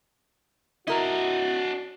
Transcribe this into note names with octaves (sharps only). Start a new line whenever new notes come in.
D4 E4 F#4 A#4 D#5